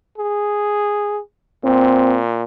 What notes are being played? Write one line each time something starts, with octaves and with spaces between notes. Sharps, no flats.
G#4
A#2 C4